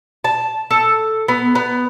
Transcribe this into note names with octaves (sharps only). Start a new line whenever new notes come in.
A5
A4
B3
B3